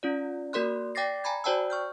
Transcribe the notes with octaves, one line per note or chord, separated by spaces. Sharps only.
C#4 F4 D5
A#3 F#4 A#4 D5 C6 F#6
D5 G5 D6 A6 A#6 C7
G#5 A#5 B5 G#6
F#4 C5 D5 G5 A5 E6
C#6 F6 G6